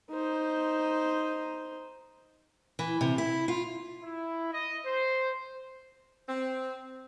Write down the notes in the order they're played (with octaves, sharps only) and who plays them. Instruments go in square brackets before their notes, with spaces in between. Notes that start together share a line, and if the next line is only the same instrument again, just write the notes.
[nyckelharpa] D#4 C5
[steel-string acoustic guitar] E3
C3
E4
F4
[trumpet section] E4
D#5
C5
[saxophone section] C4